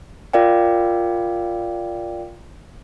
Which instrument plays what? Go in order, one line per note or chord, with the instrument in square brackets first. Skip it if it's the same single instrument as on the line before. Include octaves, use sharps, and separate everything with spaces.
[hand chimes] F4 A#4 D5 F5 G5